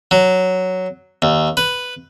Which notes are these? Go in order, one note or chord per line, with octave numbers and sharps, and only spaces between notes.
F#3
D#2
B4